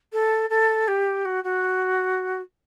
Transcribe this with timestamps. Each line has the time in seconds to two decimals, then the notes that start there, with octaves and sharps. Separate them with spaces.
0.12 A4
0.50 A4
0.88 G4
1.25 F#4
1.44 F#4